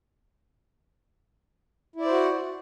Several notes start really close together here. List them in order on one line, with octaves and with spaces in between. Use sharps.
E4 D5 C5 F#4